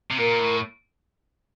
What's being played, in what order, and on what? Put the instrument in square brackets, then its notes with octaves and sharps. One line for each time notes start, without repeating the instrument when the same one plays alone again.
[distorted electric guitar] C3
[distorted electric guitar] A#2 [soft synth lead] A#4
[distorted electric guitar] A2